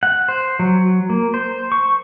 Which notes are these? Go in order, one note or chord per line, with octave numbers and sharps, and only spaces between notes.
F#5
C5
F#3
A#3
C5
C#6